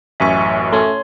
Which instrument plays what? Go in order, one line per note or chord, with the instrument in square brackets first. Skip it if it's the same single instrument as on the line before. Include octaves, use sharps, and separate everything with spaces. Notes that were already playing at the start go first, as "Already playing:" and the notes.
[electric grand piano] A1 F#2 C#6 [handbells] E5 G#5
[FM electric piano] A3 C#4 [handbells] C#5 C6